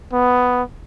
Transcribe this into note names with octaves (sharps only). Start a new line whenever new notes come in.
B3